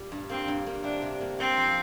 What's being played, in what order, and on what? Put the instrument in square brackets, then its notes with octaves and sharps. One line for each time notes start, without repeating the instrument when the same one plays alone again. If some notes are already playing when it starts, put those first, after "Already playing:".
Already playing: [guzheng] A#2 G3
G2
[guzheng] A#3 [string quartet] C4
[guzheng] G2
A#3
[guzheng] C3 [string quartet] D4
[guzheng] C3
A#3
[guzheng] A#3 [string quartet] C4
[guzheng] F3